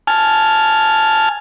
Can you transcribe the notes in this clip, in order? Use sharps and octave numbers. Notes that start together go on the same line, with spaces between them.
G#5 A5 F6